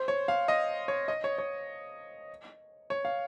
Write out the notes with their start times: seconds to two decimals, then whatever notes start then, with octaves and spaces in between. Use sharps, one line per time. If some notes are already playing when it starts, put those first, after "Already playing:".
Already playing: C5
0.08 C#5
0.28 F5
0.48 D#5
0.88 C#5
1.08 D#5
1.24 C#5
1.38 C#5
2.90 C#5
3.05 F5